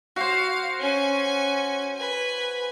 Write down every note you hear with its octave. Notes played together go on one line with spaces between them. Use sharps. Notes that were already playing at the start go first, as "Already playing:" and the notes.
F#4 C5 F5
C#4 G#5
B4 G#5